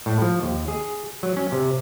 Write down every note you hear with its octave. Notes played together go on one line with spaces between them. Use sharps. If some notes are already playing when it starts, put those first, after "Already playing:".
A2
F3
D#2
G#4
F#3
C#4
C3